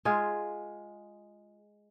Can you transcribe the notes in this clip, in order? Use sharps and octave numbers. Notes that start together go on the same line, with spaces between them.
G#3 F4 G#4